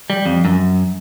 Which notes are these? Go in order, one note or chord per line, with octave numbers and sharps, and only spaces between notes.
G3
F2
F#2